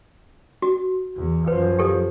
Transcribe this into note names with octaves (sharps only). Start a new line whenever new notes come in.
F#4
E2
F#2 F3 B4
G4 A4